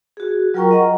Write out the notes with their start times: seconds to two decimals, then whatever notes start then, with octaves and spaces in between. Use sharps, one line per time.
0.17 F#4 G#4
0.54 F#3 F4 A#4 G5 A#5 C#6
0.71 D#5 F#5 A#5